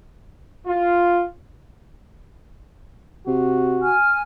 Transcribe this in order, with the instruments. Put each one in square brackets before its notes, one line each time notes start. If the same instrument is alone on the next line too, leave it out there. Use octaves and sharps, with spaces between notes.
[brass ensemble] F4
[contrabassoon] C3 [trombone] F#4
[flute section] G#5 F6